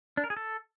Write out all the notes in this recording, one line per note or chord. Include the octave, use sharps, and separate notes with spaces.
D4
A#4
G#4
A4